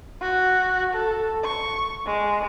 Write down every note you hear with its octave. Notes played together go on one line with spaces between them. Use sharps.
F#4
A4
C#6
G#3